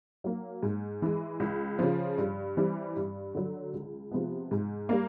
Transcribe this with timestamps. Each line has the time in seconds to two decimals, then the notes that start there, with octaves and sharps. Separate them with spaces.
0.24 F#3 A#3
0.63 G#2
1.02 E3 G#3
1.40 C#2
1.79 C#3 F3
2.18 G2
2.57 E3 G3 C4
2.96 G2
3.35 D3 F#3
3.74 C#2
4.11 C3 F3 G#3 B3
4.51 G#2
4.89 G3 A#3